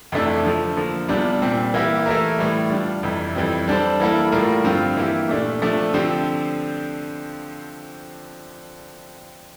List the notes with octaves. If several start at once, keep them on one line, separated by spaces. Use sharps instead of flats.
F2 C3 E3 A3 D4
D3 F3 A3
D3 F3 A#3
E2 C3 G3 D4 F4
A#2 G3 C4
E3 A#3 E4 G4
E3 A3 E4 A#4
A2 E3 G3
G3 D4 F4
F2 C3 E3 G3
F2 E3 G3 C4
G3 D4 A4 C5
E3 G3 A#3 E4 A4
A2 G3 A#3 F4 A#4
G2 D3 F3 C4 F4
E3 A#3 E4 G4
A#2 A3 D4
C3 F3 A3 D4
D3 F3 C4 G4 C5